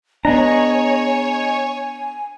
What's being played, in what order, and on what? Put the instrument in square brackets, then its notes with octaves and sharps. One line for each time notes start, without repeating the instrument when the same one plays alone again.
[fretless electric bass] B3 D4 [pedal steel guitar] G#4 D#5 A#5 [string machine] C#5 [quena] G#5